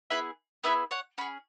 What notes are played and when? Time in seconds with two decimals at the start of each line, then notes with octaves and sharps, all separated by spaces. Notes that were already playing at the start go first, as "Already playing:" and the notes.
0.10 B3 E4 G#4 B4 E5
0.64 B3 E4 G#4 B4 E5
0.91 C#5 F#5
1.18 C#4 G#4 F#5 B5